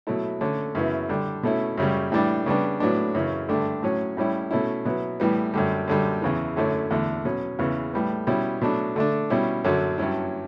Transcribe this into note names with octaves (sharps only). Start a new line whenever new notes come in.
B2 F#3 A3 E4
D3 A3 C#4
F#2 C#3 E3 B3 E4
D3 G3 D4
B2 A3 C#4 E4
F#2 C#3 G3
A2 E3 G3 D4
C#3 G3 B3 D4
A2 F#3 B3 D4
F#2 C#3 E3
G2 D3 A3 D4
A2 F#3 C#4
A2 G3 C#4 E4
B2 A3 C#4 E4
B2 F#3 B3 E4
A2 E3 G3 B3
F#2 D3 G3
F#2 D3 G3
E2 C#3 E3
F#2 D3 A3 C#4 E4
E2 D3 A3
B2 F#3 C#4
E2 C#3 E3 B3
A2 G3 B3
B2 G3 C#4 E4
B2 F#3 A3 D4
D3 A3 D4
B2 G3 C#4 E4
F#2 D3 F#3
G2 F#3 C#4 E4